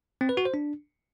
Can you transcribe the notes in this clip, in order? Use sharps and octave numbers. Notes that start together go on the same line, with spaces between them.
C4
B4
F#4
C5
D4